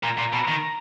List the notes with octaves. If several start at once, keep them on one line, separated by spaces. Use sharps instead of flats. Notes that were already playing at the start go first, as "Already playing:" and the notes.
A#2 A#5
A#2
B2
D#3